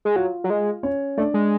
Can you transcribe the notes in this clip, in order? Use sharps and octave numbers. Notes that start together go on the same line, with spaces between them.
G#3
F#3 F4 F5
F#3
G#3
C#4 C#5
A3 D4 D5
G#3